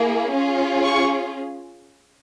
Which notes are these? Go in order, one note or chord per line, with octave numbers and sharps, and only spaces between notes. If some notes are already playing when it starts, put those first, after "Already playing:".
Already playing: A#3 E4 G#4
C#4 F4 G#4
C#6